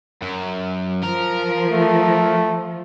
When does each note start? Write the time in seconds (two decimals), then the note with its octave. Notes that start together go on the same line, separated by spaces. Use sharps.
0.22 F#2
1.03 F3 A#4
1.70 A3